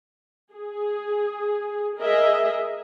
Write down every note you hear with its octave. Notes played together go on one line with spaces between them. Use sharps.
G#4
G#4 A#4 D#5 E5